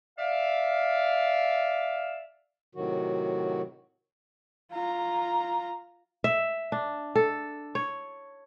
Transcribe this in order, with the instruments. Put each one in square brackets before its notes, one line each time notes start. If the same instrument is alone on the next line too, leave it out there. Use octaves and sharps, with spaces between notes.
[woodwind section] D5 E5 F5
[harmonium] A2 C3 D#3 F#3 F#4
[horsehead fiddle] F4 A#5
[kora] E5
D4
A4
C#5